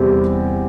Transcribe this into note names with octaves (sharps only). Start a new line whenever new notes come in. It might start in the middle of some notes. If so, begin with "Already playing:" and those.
Already playing: E2 C3 G3 C4 G4